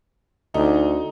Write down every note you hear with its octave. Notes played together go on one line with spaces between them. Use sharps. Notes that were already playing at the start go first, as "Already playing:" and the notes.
D2 D#4